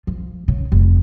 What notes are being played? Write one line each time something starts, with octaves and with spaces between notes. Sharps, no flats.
F3
C#3
F1